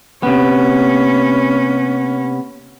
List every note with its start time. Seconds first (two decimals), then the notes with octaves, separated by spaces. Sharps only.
0.23 C3 A#3 B3 C#4